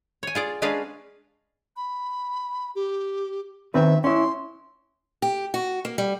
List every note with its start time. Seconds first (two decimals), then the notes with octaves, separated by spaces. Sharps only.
0.23 C#5 G#5
0.35 F4 G#4 D5
0.62 G#3 C#4 D4 G#4 B4 F5
1.77 B5
2.75 G4
3.74 D#3 C4 B4 E5
4.04 C#4 E4 C6
5.22 G4
5.54 F#4
5.85 A#3
5.98 G3